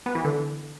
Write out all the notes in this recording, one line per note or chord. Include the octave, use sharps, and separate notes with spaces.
B3
E3
D3